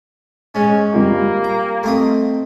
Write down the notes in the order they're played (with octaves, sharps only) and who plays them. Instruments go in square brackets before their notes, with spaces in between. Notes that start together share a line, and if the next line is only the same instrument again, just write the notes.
[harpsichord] G#2 G#3 [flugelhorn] C#4
[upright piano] G3 F4 [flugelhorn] A#3
[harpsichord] A#5
A3 C4 D#5